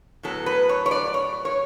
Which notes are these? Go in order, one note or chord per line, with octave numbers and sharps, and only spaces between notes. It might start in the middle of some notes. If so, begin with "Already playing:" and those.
A2 F#3 B3 A4
B4
C#5
C#5
D5
C#5
C#5